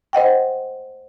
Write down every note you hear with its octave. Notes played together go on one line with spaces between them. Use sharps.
C5 D#5 F#5 G5